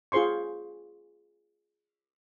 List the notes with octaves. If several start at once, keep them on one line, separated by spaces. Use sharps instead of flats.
F4 G#4 C5 C6 C#6